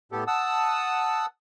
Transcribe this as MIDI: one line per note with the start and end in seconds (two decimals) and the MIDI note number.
0.12 0.24 45
0.12 0.24 59
0.12 0.24 67
0.12 0.24 69
0.27 1.26 78
0.27 1.26 81
0.27 1.26 87
0.27 1.26 88